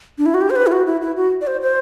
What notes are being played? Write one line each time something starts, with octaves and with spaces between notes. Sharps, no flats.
D4
E4
F#4
G4
C5
B4
E4
F#4
E4
E4
F#4
D5
C5
C5